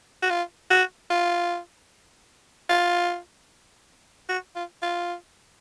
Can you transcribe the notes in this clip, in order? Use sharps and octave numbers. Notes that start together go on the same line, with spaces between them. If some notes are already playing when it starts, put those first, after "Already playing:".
F#4
F4
F#4
F4
F4
F#4
F4
F4